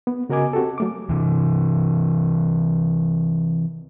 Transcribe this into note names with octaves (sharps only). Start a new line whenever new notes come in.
B3
C#3 F#4 A#4 D#5 G#5 D6
C4 F#4 G4 A4
F#3 A3 D6
C3 E3